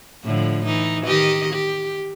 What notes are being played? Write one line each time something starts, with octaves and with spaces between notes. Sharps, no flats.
A2 D3 F3
E3 D#4
D#3 G4 D#5
G4